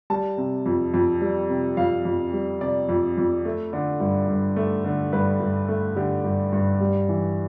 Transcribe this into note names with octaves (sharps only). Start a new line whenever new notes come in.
G3 A5
C3
F2
F2
G3
C3
F2 F5
F2
G3
C3 D5
F2
F2
A3
D3
G2
G2
A3
D3
G2 B4
G2
A3
D3 G4
G2
G2
G3
E3